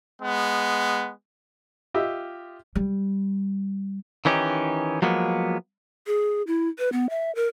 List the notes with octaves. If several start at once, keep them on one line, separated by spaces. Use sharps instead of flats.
G#3 B3
F4 G4 D#5 E5
G3
D#3 E3 C#4 D#4 G4
F3 F#3 G#3 A#3 B3
G#4
E4
B4
B3
E5
A#4